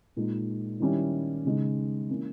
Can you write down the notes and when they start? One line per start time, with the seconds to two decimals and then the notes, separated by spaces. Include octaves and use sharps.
0.17 A#2 G#3 D#4
0.80 D#3 G3 C#4 E4
1.45 C#3 G#3 D#4
2.10 E3 A#3 C#4 E4